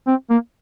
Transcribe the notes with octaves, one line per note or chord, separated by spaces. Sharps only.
C4
A#3